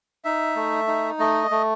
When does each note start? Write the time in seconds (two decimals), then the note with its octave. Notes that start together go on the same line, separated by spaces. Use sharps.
0.24 D#4 E5
0.56 A3
0.88 D#4
1.19 A3 D#5
1.51 A3